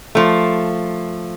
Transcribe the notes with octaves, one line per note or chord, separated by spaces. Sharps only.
F3 A3